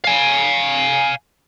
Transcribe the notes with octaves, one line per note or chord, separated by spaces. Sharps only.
F5 G#5